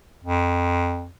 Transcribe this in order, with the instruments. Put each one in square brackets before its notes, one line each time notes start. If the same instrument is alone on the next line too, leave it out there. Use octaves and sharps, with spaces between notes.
[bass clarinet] F2